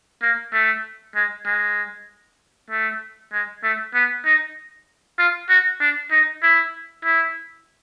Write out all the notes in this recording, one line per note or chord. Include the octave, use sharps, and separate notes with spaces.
A#3
A3
G#3
G#3
A3
G#3
A3
B3
D#4
F4
F#4
D4
D#4
E4
E4